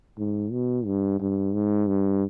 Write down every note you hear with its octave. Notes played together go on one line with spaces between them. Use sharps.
G#2
B2
G2
G2
G#2
G2